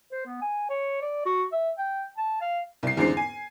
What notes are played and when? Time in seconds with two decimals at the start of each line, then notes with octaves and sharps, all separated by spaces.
0.12 C5
0.26 B3
0.42 G#5
0.70 C#5
1.02 D5
1.26 F#4
1.52 E5
1.78 G5
2.18 A5
2.42 F5
2.83 C2 C7
2.97 E2 G#2 D3 C4 C7
3.17 G#5